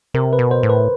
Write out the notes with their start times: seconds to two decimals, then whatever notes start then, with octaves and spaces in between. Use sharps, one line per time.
0.14 C3 A#4
0.33 B4
0.39 B2
0.51 C5
0.63 A2
0.69 B4